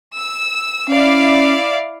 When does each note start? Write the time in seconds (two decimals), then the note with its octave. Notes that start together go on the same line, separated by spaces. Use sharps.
0.15 E6
0.88 C#4 E4 D5 F5